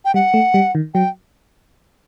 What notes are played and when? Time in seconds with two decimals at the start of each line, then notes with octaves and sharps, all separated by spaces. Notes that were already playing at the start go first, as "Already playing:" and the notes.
0.05 G5
0.14 G3 F#5
0.34 A3
0.54 G3
0.75 D#3
0.94 F#3 G5